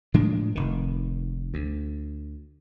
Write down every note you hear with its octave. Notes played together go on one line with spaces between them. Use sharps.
A2 F3 G#3 D4
F1 D#3
D2